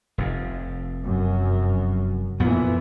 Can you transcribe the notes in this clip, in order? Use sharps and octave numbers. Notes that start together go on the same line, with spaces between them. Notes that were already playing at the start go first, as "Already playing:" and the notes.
F1 F2
F#2
F2 A#2 E3 B3